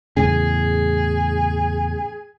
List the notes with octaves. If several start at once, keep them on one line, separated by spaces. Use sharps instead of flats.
E2 A2 C#3 G#4